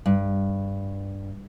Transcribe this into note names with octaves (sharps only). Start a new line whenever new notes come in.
G2